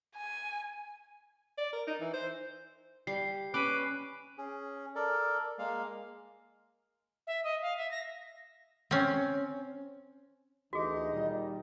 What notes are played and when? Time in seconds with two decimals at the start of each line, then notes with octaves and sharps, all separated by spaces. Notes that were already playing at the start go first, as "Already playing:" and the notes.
0.17 G#5
1.58 D5
1.73 A#4
1.87 D#4
2.01 E3
2.14 C5
3.07 G3 C7
3.54 C#4 B4 B5 D6 F#6 D#7
4.38 C#4 G#4
4.95 A4 A#4 D5
5.59 G#3 A#3 F5
7.27 E5
7.44 D#5
7.62 F5
7.77 E5
7.91 A#6
8.91 C4 C#4
10.73 D2 E3 D#4 F#4 G#4 D#5
11.12 A#2 D#3 G3